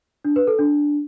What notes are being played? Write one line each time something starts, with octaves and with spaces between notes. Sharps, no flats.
D4
B4
A4
D4